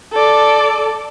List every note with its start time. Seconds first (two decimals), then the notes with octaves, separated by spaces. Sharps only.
0.12 A4 D5